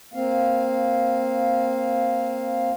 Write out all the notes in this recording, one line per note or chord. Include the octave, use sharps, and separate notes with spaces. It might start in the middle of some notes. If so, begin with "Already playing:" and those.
A#3 C4 F5